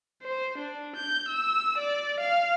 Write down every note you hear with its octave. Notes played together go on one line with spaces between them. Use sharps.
C5
D4
G6
E6
D5
F5